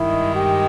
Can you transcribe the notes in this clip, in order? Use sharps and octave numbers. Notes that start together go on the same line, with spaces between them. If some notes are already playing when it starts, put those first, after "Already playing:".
Already playing: G2 D#3 G#3 E4
G4